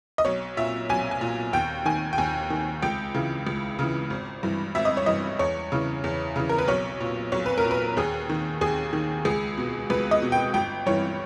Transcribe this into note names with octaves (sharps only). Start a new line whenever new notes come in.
D#5
B1 C#5
A#2 E5
B1 G#5
G#5
A#2
D#2 G5
D#3 G#5
G5
D#2 G#5
D#3
C#2 G5
C#3 E3
C#2
C#3 E3
G#1
G2 E3
G#1 E5
D#5
C#5
G2 E3 D#5
E2 C#5
C#3 E3
E2
C#3 E3
A#4
B4
B1 C#5
A#2
B1 C#5
B4
A#4
A#2
B4
D#2 G#4
D#3
D#2 G#4
D#3
C#2 G#4
B2
C#2 B4
D#5
B2
G5
G1 G5
G2 E3 C#5